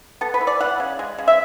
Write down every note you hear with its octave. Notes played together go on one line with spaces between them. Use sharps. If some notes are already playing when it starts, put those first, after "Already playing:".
B3 A4
B4
E3
D5
E3 F#5
C#3
G#3
C#3
E5